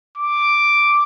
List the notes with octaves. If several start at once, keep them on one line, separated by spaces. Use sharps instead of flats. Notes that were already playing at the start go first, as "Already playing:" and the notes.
D6